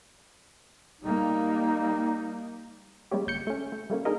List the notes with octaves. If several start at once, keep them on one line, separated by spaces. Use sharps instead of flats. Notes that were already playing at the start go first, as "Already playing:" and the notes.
G3 A#3 D#4
G3 G#3 A#3 C#4 G4
G1 G6 C#7
A3 C#4
A3
G3 A3 A#3 C#4
D4 D#4 G#4 A#4 D#5